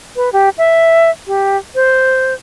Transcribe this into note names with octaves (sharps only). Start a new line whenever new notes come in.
B4
G4
E5
G4
C5